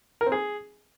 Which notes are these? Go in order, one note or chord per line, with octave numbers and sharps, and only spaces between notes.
A#4
C4
G#4